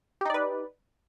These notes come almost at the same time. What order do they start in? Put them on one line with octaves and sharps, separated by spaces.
G4 D#4 D5 B4